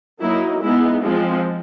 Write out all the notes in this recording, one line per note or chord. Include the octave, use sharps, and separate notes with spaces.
F#3 A#3 D#4 E4
G#3 B3 D#4 E4
F3 G#3 C4